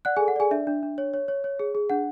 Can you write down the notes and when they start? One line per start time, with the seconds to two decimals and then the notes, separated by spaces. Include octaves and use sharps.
0.05 D5 F#5 F#6
0.17 G#4 G#5
0.20 A4
0.28 F#5
0.36 G#4 D5 G#5
0.51 D4 E5
0.67 D4
0.83 D4
0.98 C#5
1.14 C#5
1.28 C#5
1.44 C#5
1.60 G#4
1.75 G#4
1.90 D4 F#5